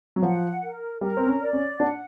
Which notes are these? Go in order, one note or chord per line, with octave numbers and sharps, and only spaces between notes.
F#3
F3 F#5
A#4
G3 A#4
C4
C#4
D5
C#4
D4 F#5